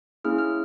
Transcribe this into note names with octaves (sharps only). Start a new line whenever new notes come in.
A#3 C#4 E4 G#4 F6
F6